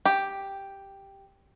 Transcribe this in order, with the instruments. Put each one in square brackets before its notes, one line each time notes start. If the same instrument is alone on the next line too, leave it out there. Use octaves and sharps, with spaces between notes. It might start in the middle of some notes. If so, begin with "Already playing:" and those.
[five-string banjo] G4